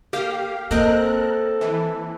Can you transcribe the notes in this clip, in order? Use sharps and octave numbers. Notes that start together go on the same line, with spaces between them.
A#3 G4 F5
A#3 C4 A4 A#4 D#5 F#6
E3